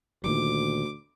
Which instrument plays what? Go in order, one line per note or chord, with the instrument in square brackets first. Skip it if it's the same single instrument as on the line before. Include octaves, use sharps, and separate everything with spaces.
[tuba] D2 [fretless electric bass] A#2 D#3 G3 [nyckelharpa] D6